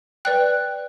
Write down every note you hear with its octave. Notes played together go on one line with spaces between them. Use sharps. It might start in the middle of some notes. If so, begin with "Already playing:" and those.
B4 D5 G5 F#6